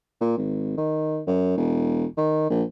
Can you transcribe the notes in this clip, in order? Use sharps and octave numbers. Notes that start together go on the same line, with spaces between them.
A#2
G#1
D#3
F#2
E1
D#3
A#1